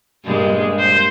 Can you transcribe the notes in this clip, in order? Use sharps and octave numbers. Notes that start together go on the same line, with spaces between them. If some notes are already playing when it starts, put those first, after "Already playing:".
G2 A#2 G#3
C5